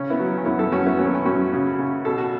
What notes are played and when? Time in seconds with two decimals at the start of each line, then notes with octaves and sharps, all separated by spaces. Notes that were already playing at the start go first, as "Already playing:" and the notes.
Already playing: C#3 C#4
0.10 B3 E4
0.19 F#3
0.38 C#4
0.45 F#2 B3 E4
0.59 E4 A4
0.72 F#2 C#4 F#4
0.86 B3 E4
0.98 F#3 C#4
1.07 B3
1.14 C#4
1.25 F#2 C#4 F#4
1.52 C#3
1.79 C#3
2.05 B2 A4
2.18 F#4